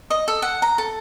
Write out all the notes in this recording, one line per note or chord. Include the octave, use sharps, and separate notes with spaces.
D#5
A4
F#5
A#5
A4